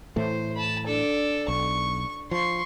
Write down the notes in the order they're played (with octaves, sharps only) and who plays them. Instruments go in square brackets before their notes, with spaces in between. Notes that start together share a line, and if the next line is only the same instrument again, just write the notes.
[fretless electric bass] A2 E3 A3 [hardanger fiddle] C5
[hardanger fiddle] A5 B5
D4 A4
[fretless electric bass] B1 [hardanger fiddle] C#6
[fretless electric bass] F3 [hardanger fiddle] C6 C#6